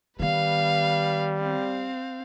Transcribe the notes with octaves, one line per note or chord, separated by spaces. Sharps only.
D#3 G3 B3 B4 F5
C4 F5